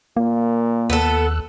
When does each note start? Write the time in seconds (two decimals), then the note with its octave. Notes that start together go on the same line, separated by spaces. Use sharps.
0.17 A#2 A#3
0.90 D#2 B3 A4 E6 F#6